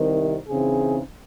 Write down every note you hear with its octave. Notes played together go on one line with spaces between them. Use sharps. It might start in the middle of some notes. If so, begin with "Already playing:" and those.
Already playing: C2 C3 D#3
C#3 E3 C4 D#4 G#4